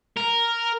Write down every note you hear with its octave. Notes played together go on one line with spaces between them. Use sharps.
A#4